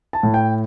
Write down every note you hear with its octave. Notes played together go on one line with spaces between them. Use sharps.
A5
A2
G5